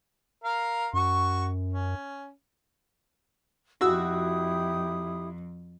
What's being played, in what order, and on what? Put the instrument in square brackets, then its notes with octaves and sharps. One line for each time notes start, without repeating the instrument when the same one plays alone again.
[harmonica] A#4 F5
[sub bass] F#2 [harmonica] F#4 C#6
[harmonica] C#4
[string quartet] F2 [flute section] E4 G4 D#6 [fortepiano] F#4 E6